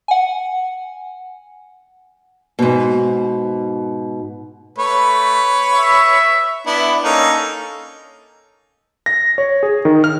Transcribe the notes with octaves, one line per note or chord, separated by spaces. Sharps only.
F#5 G#5
G#2 B2
A3 B4 C#5
E5
B3 D4 E4
A#3 C#4 D#4 A4
A#6
C#5
G#4
D#3
F6